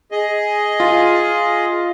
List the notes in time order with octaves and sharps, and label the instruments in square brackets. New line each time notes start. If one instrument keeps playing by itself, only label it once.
[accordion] G#4 D#5
[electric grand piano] F4